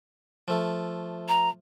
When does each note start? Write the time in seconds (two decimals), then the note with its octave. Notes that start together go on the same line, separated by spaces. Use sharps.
0.48 F3 A3
1.28 A#5